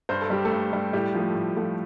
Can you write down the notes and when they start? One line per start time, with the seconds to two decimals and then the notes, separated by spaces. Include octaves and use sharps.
0.09 G2 C5
0.21 A4
0.30 G3 G4
0.45 A3 A4
0.52 G2
0.73 G3
0.93 A2 G3 G4
1.15 F3 A3
1.35 A2
1.57 F3 A3